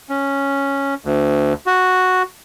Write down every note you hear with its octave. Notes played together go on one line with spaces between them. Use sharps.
C#4
D2
F#4